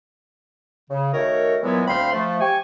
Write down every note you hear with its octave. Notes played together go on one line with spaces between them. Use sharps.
C#3
D#3 A3 F#4 A#4 C#5
A#2 E3 F#3 G#3 B3
D2 C4 F5 B5 C6
F3 A3
G4 G#5 C#6